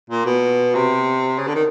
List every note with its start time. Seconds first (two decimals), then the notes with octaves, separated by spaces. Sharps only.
0.10 A#2
0.26 B2
0.75 C3
1.38 C#3
1.47 D3
1.55 D#3